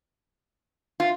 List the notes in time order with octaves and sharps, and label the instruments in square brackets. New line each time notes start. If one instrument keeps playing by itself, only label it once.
[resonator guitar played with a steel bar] F4